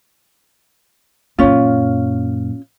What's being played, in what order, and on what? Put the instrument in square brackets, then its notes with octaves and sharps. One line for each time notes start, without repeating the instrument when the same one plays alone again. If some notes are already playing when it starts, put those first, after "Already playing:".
[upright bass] F#2 A#2 [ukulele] C#4 F4